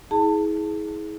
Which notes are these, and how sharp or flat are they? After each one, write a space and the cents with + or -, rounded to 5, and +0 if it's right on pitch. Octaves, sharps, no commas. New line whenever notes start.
E4 -40 G#4 +15 A5 +25